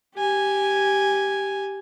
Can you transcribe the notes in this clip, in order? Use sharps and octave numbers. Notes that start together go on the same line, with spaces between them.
G4 G#5